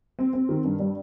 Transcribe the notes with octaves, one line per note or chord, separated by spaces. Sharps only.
C4
C4
D#3
G2
G3